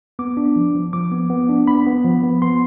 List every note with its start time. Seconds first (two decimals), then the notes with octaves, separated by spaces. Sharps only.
0.19 B3 D6
0.37 D4
0.56 F3
0.75 F3
0.93 F3 D6
1.12 B3
1.30 B3
1.49 D4
1.67 B3 B5
1.87 B3
2.04 F3
2.23 B3
2.42 B3 C6